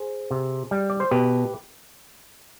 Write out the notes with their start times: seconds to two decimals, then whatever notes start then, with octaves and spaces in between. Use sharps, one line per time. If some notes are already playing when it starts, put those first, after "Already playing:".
Already playing: G#4 C5
0.31 C3
0.71 G3
0.90 D5
1.00 C5
1.11 B2 G4 B4